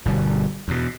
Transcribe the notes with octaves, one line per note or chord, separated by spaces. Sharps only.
G1 B2 G3
E2 B2